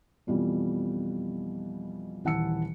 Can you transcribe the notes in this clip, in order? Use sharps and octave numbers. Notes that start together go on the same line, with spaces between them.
F2 B2 E3 F3 G3
D#1 E3 F#5 A5 E6 C#7